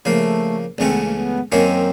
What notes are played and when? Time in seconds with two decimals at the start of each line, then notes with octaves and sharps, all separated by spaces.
0.05 C#3 F3 A3 A#3
0.78 C#2 C#3 E3 A3 C4 C#4
0.91 B3
1.04 A#3
1.17 B3
1.52 F#2 D#3 F#3 A#3 C4 C#4